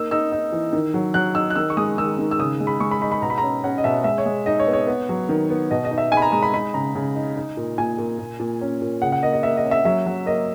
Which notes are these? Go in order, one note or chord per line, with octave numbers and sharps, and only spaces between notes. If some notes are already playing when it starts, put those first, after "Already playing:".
Already playing: A#3 D#4 E6
D#4 E6
D#4
E3
D#3
F#3
F#3 F#6
D#4 E6
F#6
D#3 E6
C#6
G#3 D#6
D#3 E6
D#3
E6
C#3 D#6
G#3
B5
G#3 C#6
B5
D#4 B5
B5
B2 A#5
B5
C#4 A#5
C#4 F#5
D#5
B2 E5
G#3 E5
C#5
G#3
D#4 D#5
C#5
B3
C#5
B3
F#3
D#3
B3
B2 D#5
D#5
D#4
E5
D#4 G#5
B5
A#5
G#3 A#5
B5
D#4 B5
C#3 A#5
C#3
D#4
D#4
A#2
A#2 G#5
A#2
A#2
A#2
C#4
A#2
C#3 F#5
F#5
A#3 D#5
D#5
A#3 E5
D#5
C#4
E5
F#3 E5
F#3
A#3 D#5